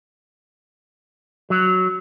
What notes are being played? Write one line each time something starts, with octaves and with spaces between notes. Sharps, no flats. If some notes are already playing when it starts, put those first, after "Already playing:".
F#3